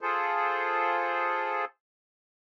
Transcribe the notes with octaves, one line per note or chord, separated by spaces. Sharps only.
F4 G#4 A4 C5